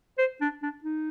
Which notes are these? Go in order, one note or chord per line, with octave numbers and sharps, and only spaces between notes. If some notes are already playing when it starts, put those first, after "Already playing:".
C5
D4
D4
D#4